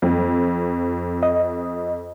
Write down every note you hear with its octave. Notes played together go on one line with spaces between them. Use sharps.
F2
D#5